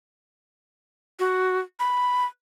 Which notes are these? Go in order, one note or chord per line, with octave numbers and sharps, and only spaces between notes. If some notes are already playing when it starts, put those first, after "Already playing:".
F#4
B5